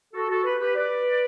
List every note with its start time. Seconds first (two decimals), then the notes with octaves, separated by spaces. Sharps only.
0.14 F#4 A4
0.29 F#4 A4
0.44 G4 B4
0.60 G4 B4
0.75 B4 D5